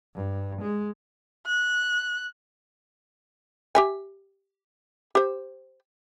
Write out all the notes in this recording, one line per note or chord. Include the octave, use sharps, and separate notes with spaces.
G2
G#3
F#6
G4 E5 G#5
G4 C5